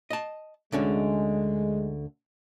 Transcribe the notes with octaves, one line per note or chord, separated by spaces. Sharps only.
D#5 A5
D2 D3 G#3 C#4